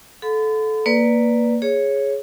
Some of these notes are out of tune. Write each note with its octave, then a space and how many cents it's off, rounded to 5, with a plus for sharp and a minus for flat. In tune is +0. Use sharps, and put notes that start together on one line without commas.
A4 -20 F#5 -45 B5 +45
A#3 +0 B4 +0 D5 +0
G#4 +0 C#5 -5